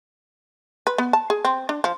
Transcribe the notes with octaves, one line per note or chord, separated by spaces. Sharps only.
B4
B3
A5
G#4
C4
D4
F3